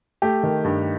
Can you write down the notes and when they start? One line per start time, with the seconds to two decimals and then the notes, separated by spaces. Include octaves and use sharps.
0.22 A3 G4
0.43 D#3
0.64 G2